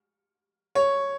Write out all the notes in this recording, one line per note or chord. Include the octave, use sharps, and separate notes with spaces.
C#5